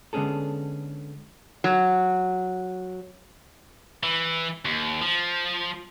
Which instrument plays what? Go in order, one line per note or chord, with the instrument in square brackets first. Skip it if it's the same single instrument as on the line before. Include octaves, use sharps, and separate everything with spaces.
[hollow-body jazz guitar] D3 G#3 B3 C#4 G#4 A4
[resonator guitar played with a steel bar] F#3
[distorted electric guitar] E3
D#2
F3